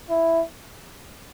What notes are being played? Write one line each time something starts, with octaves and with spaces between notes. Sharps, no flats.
E4